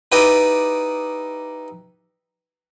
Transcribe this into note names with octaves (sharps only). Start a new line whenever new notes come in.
D#4 E4 G4 B4 D5 D#5